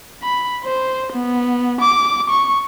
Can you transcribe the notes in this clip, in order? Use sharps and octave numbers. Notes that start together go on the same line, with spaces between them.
B5
C5
B3
D6
C#6